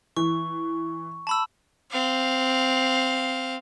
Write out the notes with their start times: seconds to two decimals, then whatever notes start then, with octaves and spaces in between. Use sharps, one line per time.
0.17 E3 C#6
1.27 A5 B5 E6
1.91 C4 F5